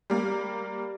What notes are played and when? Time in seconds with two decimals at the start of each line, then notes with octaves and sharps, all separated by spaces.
0.10 G3 A#3